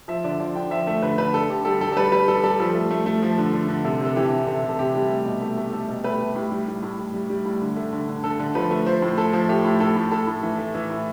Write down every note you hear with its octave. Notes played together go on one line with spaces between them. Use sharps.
F3 E5
D3 D5
F3 D5
D3 G5
F3 E5
A3
D3 B4
D3 B4
D3 A4
D3 G4
G3 A4
G3 A4
A4
G3 B4
G3 B4
G3 A4
G3 A4
F3 A4
A3
A3
A3
F3
D3
D3
D3
C3 A4
C3 A4
E3 G4
C3
C3 A4
C3
A4
C3 G4
G3
A3
B2
A3
A3
A3 A4
B2
A3 B4
A3
A2 G4
G3
A2
A2
A2
G3
G3
A2
D3
A3
D3
D3
D3 A4
D3
F3 B4
A3
F3 C5
A2
A3 A4
F3
A3 G4
A2
A2 A4
A2
A2 A4
A2
E3
A3
E3
A2